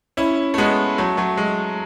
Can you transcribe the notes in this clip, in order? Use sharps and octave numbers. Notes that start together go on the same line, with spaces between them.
C#4 E4
A3
G#3 B3
F#3 A3
F#3 A3
G#3